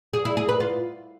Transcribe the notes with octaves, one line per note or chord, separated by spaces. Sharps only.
G#4
E4
G#4
B4
F4